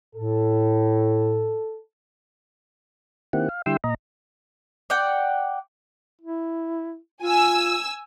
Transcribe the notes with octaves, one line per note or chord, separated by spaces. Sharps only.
A2 A4
D#3 A#3 C4 E4 G4 F#5
F5
D3 G3 E4 G5 C6 E6
A#2 D#5 A#5
D5 F#5 G5
E4
F4 G#5 E6